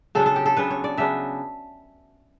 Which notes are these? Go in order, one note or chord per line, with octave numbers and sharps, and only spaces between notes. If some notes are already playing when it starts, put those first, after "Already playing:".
C#3 F#3 B3 D4 A4
A4
G4
A4
C#3 F#3 B3 D4 B4
C#5
D5
C#3 F#3 B3 D4 E5